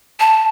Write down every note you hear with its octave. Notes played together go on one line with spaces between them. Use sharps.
A5